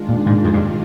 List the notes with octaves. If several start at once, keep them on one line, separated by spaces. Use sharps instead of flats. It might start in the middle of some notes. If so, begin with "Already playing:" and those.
Already playing: D#3 G#3 D4 F4
A#2
G#2
F2
G2